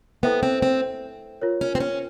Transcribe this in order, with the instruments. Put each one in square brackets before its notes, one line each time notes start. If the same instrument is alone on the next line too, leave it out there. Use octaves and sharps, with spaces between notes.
[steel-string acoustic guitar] B3 [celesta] E4 A4 C5 E5 G5
[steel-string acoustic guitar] C4
C4
[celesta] F4 A#4 C#5
[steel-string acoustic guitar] C#4
C4
C#4